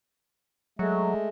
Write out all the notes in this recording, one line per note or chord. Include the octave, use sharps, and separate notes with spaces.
F#3 G#3 A3